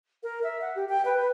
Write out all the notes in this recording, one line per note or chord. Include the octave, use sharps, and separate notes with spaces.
A#4
E5
F#5
G4
G5
B4
B4